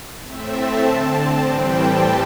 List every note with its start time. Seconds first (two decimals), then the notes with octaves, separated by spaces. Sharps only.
0.24 A2 A3 C4 E5
0.54 A5
0.82 D3 C4 A5
1.40 A2 E3 G3 C4 G5
1.68 A5